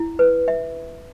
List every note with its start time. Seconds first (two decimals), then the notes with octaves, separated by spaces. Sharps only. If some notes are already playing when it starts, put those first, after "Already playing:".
Already playing: E4
0.19 B4
0.48 E5